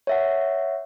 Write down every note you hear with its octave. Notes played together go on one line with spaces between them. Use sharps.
C#5 E5 F#5